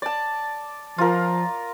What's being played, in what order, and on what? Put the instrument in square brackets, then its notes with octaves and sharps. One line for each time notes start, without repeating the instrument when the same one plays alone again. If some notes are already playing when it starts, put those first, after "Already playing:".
[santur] D5 A5
[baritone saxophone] F3 [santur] F4 A#4